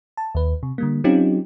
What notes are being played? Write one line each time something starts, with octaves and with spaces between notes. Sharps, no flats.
A5
D#2 B4
C3
D3 G3 A#3
F#3 C4 C#4 D#4 F4 G4